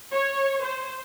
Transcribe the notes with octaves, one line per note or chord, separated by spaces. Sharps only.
C#5
C5